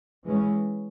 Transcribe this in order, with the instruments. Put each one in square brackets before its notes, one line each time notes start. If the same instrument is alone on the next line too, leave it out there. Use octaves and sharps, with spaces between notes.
[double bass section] E3 G#3 C#4